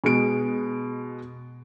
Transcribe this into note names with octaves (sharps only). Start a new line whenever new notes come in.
B2 G#3 D7